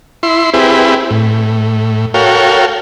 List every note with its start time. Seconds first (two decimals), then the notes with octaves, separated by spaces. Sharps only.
0.23 E4 C6
0.54 C4 E4 G4 G#4 B4
1.11 A2
2.14 F#4 A4 A#4 C#5 F5 G5